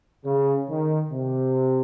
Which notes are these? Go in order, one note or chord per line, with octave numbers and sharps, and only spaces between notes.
C#3
D#3
C3